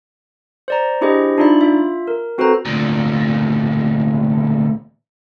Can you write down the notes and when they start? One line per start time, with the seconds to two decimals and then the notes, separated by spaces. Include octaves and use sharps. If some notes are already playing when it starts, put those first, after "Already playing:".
0.68 C5 D5 A#5
1.01 D4 E4 G4 G#4 C5 D#5
1.38 D4 D#4 F4 D5 E5 B5
1.61 F4 E5
2.08 A#4
2.38 C4 F#4 A4 B4 C5 A#5
2.65 D2 A#2